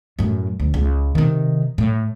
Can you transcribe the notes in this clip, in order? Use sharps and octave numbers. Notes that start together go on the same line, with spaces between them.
F#2 A2
D2
C#2
C3 D#3
A2